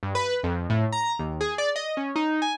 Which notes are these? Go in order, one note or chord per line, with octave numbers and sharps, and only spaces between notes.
G2
B4
F2
A2
A#5
D#2
G#4
D5
D#5
C#4
D#4
G#5